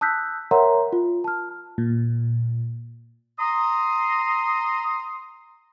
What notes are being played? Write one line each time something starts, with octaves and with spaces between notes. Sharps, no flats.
A5 D#6 E6 F#6 G6 B6
A#4 C#5 E5 F#5 A#5 C6
F4
A5 F6
A#2
A#5 C6 D#6